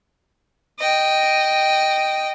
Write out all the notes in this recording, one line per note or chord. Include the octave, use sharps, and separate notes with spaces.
D#5 G5